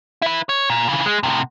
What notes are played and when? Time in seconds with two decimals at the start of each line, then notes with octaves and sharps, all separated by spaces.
0.22 E4 B4
0.49 C#5
0.70 A#2
0.89 C#3 E3
1.06 G#3
1.23 A2 C3